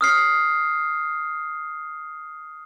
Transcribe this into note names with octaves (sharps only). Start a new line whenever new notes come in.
D#6 F6 C7